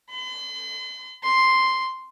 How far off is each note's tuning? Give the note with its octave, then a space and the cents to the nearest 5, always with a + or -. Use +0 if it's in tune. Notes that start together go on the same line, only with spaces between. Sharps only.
C6 -45
C6 +0